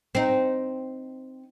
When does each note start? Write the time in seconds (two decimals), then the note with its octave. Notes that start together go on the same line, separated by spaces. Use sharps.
0.15 C4 D#4